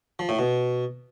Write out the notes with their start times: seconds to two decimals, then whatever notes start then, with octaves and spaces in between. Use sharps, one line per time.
0.19 F3
0.29 A2
0.39 B2